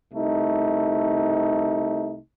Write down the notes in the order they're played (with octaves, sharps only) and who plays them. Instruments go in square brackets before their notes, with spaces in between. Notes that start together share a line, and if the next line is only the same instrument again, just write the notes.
[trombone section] C2 A3 D#4